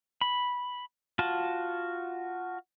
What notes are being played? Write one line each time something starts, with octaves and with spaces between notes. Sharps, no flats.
B5
F4 F#4 A5